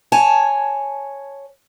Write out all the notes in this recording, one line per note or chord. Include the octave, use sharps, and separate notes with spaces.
C#5 G#5 A5